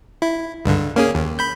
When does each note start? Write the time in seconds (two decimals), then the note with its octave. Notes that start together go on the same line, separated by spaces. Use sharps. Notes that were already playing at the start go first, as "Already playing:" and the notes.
0.22 E4
0.65 C#2 G2 D3
0.96 A#3 C#4 G#4
1.15 D#2
1.39 B5 G6